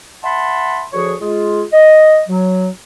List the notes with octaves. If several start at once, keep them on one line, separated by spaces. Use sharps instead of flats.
E5 F#5 A5 B5 C6
D2 F3 F#4 G#4 C#5 C#6
G#3 F4 G#4
D#5
F#3